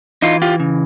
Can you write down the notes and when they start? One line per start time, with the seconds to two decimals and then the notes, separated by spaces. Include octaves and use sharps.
0.22 E3 D#4 F4
0.42 F4 G4
0.60 C#3